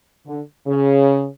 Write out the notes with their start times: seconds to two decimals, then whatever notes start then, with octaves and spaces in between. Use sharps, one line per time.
0.27 D3
0.67 C#3